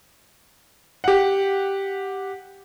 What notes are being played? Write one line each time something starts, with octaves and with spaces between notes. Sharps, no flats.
G4 F#5